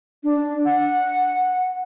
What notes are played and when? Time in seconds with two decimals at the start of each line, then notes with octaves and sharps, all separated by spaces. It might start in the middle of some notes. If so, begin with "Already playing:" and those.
0.24 D4
0.65 F#5